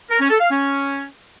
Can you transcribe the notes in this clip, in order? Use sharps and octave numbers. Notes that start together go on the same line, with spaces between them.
A#4
C#4
A4
F5
C#4